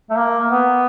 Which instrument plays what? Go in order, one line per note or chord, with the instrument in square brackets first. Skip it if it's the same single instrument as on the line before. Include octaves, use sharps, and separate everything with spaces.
[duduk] A3
A#3
B3